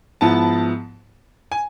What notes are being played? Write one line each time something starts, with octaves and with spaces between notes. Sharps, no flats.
G#2 F3 B3 E4 A5
G#5